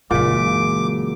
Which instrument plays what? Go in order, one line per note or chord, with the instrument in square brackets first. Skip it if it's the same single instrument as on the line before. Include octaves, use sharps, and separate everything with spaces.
[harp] F#1 B6 [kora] A#2 [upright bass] E3 G#3 [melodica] D6